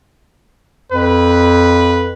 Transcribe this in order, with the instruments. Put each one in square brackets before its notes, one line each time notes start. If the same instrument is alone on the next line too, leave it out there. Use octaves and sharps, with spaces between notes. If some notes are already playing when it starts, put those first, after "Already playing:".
[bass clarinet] F2 [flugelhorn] B4